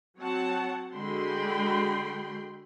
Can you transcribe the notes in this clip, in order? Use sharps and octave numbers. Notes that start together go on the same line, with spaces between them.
F#3 C4 C#5 F#5 A5
D3 G#3 F#4 G5 B5 C6